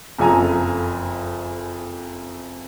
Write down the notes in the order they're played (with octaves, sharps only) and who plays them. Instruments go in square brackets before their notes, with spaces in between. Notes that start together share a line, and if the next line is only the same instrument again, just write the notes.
[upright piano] F#1 F2 F4 A4 G#5 A#5